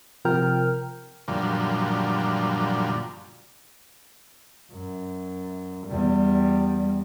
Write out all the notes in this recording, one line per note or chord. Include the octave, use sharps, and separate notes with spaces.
C3 F3 A#4 G5 F6
F#2 A#2 D3 F3 G3
F#2
E2 G3